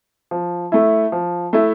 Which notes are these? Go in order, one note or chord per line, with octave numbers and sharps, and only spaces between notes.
F3
A3 E4
F3
A3 E4